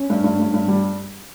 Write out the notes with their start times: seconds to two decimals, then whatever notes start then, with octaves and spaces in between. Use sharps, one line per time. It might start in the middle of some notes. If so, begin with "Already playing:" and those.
Already playing: C#4
0.10 G2
0.24 G2
0.39 G2
0.54 G2
0.68 G3